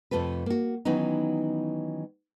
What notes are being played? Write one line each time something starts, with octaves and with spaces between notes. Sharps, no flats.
F2 C3 A3 F4 B4
A#3 F#4
D#3 E3 F#3 B3 C#4 D#4